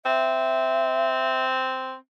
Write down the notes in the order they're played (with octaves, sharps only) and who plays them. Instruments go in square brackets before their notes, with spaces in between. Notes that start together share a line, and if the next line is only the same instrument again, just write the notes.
[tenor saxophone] C4 [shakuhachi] E5